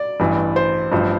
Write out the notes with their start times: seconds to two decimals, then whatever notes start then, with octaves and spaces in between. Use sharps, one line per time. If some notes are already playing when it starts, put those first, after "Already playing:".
Already playing: D5
0.20 A1 G2 E3
0.56 C5
0.92 A1 G2 F3